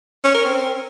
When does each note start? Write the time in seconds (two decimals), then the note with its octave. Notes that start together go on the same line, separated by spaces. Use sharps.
0.24 C#4
0.34 A#4
0.44 C4